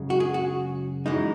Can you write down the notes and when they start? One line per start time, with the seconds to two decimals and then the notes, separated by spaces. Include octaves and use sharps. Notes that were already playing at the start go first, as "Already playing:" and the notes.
Already playing: F#2 C#3 G#3
0.10 F#4
0.20 G#4
0.34 F#4
1.06 F#2 E3 G#3 D#4